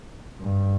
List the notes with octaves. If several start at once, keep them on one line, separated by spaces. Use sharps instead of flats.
G2